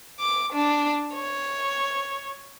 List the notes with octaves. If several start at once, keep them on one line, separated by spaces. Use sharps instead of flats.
D6
D4
C#5